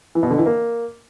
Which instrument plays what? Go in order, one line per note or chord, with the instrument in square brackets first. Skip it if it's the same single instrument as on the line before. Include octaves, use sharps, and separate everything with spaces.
[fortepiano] E3
B2
D3
E3
A#3